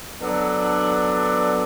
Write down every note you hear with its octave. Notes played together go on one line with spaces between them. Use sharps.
F#3 B3 D4 A4 D5